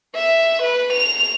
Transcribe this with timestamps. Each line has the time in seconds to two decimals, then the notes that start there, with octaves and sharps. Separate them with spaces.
0.15 E5
0.62 B4
0.93 F7